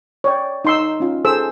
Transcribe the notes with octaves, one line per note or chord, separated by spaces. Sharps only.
C#5 D5 G5
D#4 C6 E6
C#4 F4
G#4 A4 C5 E6